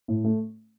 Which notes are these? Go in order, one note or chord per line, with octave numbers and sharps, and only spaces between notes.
A2
A3